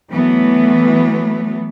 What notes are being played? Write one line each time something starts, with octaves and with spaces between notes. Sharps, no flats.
E3 F#3 A3 B3